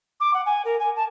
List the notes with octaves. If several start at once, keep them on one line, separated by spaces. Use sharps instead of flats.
D6
F#5
G#5
A#4
G#5
A5